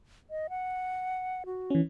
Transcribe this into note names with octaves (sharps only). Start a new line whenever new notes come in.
D#5
F#5
F#4
E3 C#4